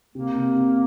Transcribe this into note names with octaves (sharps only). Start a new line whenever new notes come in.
C3 A#3
C3
C3